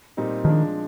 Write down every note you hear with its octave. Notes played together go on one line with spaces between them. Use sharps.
A#2 G3 C4 D#4
D#3 F3 G#3 D4